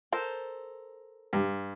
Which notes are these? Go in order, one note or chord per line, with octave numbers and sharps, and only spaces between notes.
A4 A#4 C5
G2